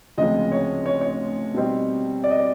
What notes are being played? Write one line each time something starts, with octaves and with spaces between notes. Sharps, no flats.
D2 C#3 F3 G#3 C4 D#5
C#5
C#5
C#5
B2 G3 C4 D#4
D5
D#5
D5